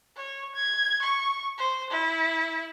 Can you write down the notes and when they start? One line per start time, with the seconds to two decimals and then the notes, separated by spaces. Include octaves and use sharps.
0.16 C#5
0.55 G#6
1.02 C#6
1.58 C5
1.90 E4